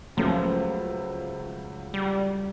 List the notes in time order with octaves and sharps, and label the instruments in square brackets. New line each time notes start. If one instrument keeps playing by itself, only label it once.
[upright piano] C#2 C#3 F#3 A3 [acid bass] F3
[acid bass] G3